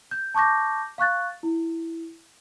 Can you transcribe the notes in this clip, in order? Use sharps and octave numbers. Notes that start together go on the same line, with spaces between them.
G6
A5 C#6 D6 G6 A#6
F5 C#6 F#6 A6
E4